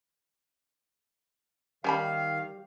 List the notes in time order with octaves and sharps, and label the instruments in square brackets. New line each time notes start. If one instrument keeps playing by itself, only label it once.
[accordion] D#3 F5 [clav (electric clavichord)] G3 [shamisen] C#4 G#5 B5